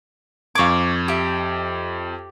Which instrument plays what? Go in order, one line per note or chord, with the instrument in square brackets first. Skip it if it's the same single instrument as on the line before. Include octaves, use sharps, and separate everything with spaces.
[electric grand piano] F2 G#6 [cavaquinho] F5 C#6 D6
[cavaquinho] G4 E5